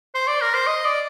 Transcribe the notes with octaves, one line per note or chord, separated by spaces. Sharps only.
C5
D5
A#4
C5
D#5
D5